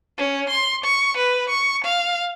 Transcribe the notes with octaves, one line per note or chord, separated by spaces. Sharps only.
C#4
C6
C#6
B4
C#6
F5